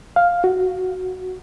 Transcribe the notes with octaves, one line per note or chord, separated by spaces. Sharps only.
F5
F#4